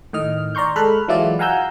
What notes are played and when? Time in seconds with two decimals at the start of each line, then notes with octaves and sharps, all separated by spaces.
0.13 A2 D#3 D#5 F6
0.55 D5 A#5 C6 C#6 G6
0.76 G#3 A4 B5 F6 F#6
1.08 E3 F#3 G#3 E4 F4 D5
1.39 F5 F#5 G#5 A#5 E6 G6